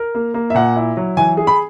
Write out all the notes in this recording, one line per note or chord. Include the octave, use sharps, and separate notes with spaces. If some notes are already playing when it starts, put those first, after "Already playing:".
Already playing: A#4
A#3
A#3
E5
A#2 F#5
E4
F#3
E3 G#5
G#4
B5